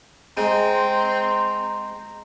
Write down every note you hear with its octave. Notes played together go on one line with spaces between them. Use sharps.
G#3 C4 A#5 C6